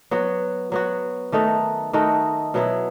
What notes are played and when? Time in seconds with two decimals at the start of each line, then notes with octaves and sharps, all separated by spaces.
0.11 F#3 B3 F#4
0.72 F#3 B3 F#4
1.32 D#3 A3 D#4 F#4
1.93 D#3 A3 D#4 F#4
2.54 B2 F#3 B3 E4